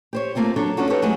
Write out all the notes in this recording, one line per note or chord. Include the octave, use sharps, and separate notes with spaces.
G4 C5 C#5
A3 A#3 C4 F4 G4
F#3 D4 A4 C#5
C#4 D4 F4 F#4 A4
D#4 G4 A4 B4 C#5
F#3 G#3 A3 C4 E4 G#4